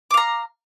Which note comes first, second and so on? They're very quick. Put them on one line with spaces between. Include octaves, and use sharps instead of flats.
D6 F5 A#5